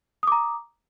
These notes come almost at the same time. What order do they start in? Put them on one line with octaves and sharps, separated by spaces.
D#6 D6 A#5